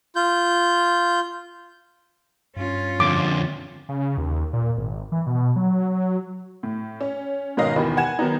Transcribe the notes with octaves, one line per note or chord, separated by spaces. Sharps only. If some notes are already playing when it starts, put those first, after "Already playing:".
F4 G6
G2 C#4 F4
F2 D3 D6
C#3
D#2
A#2
G#1
E3
B2
F#3
A2
C#4
G#2 B2 D#3 C#4 D#5 F5
D#2 B2 D#3 E3 B5
F#5 G#5 G#6 E7
D#3 F#3 B3 D#4